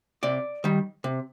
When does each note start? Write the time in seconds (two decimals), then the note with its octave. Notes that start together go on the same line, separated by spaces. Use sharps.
0.23 C3 D5
0.64 D#3 G3
1.04 C3